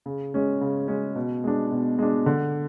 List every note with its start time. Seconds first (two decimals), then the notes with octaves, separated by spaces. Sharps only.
0.06 C#3
0.34 G#3 C#4
0.61 C#3
0.88 G#3 C#4
1.15 B2
1.44 G#3 D4
1.71 B2
1.99 G#3 D4
2.26 D3